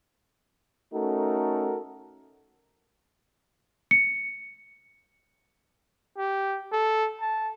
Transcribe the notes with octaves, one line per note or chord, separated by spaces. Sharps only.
A3 C#4 D#4 F#4 A4 A#4
C#7
G4
A4
A5